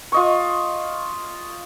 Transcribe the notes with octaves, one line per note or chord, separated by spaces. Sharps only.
F4 D#5 C#6